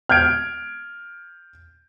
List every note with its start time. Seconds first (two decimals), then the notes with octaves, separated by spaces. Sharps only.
0.09 F6 G6 G#6 D7